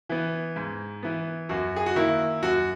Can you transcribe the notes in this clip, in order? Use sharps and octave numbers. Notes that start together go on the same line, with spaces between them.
E3 B3
G#2
E3 B3
F#2 F#4
G#4
F#4
D#3 A#3 E4
F#2 F#4